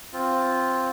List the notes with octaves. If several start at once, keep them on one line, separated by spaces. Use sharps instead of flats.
C4 F4